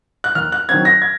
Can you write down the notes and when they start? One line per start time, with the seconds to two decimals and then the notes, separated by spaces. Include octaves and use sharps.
0.24 F#6
0.35 D#2 F6
0.52 F#6
0.69 D#3 F#3 C4 G#6
0.85 A#6
1.02 G#6